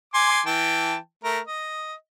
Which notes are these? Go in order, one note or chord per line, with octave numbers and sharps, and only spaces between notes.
G#5 C6 D6
E3 G5 A5
A3 A#4
D#5